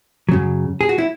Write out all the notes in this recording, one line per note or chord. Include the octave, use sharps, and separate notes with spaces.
F#2 C#3 F#3
G#4
F#4
E4